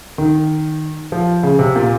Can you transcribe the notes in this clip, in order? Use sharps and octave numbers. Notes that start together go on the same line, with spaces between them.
D#3
F3
C#3
C3
A#2